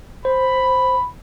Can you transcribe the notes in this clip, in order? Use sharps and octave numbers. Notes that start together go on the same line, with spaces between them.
C5 B5